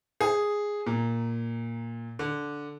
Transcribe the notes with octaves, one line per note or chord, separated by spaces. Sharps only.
G#4
A#2
D3